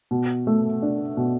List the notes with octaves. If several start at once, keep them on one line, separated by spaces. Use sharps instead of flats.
B2
A3
D4
B2